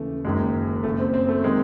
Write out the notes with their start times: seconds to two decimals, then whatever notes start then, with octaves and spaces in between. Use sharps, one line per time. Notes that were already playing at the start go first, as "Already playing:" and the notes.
Already playing: D#2 C#3 E3 A3
0.24 F#1 F#2 D#3 G#3
0.83 F#1 F#2 C#3 A3
0.98 C4
1.14 C4
1.29 A3
1.44 C3 D#3 G#3